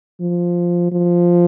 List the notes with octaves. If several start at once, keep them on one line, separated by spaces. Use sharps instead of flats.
F3
F3